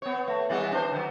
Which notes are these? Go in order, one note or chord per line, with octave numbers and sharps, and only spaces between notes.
B3 C#5
A3
E3 G3 B3
D4 C5
D3 F#3